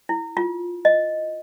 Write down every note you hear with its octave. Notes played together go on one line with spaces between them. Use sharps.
E4
F4
D#5